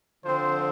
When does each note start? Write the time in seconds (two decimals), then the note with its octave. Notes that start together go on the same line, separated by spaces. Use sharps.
0.24 D3 F3 C4 C5